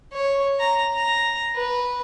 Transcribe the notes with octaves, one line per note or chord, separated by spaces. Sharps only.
C#5
A#5
A#5
B4